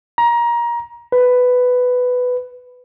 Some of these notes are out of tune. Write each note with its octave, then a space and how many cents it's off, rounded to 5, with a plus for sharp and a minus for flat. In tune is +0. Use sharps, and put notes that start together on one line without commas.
A#5 +25
B4 +10